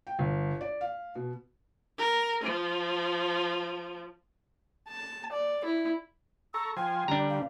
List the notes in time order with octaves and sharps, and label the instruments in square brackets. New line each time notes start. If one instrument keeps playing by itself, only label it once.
[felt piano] G5
G1
D5
F5
B2
[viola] A#4
F3
[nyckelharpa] A5
D5
E4
[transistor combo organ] A4 A#5 C#6 [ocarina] E6
[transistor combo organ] F3 C5 G#5 [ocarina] G5
[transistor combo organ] D3 G3 [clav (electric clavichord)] D4 A#5
[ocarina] F5